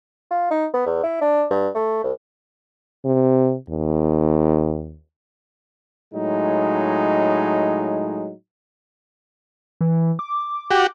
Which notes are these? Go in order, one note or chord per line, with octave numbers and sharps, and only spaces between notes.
F4
D#4
B3
E2
E4
D4
G2
A3
C2
C3
D#2
A2 F#3 G#3 D#4
E3
D6
F#4 G4